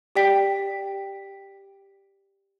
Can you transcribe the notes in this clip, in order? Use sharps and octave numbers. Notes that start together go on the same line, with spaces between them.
G4 D5 G5 B6